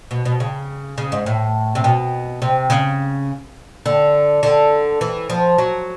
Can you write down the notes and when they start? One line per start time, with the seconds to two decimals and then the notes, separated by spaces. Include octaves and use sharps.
0.11 B2
0.25 B2
0.40 C#3
0.98 C#3
1.12 G#2
1.26 A2
1.75 C3
1.84 B2
2.42 C3
2.70 C#3
3.86 D3
4.43 D3
5.01 E3
5.30 F3
5.58 F#3